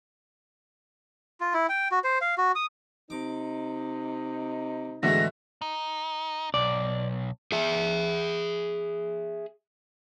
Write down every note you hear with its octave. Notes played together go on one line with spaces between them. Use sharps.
F4
E4
G5
F#4
C5
F5
F#4
D#6
C3 D#4 D6
E2 A2 D3 G#3 A3 F#4 A#6
D#4
B1 D5
G#4 E5